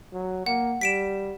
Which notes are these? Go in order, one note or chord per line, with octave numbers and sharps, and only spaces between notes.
F#3
A#3 F#5
G3 B6 D7 E7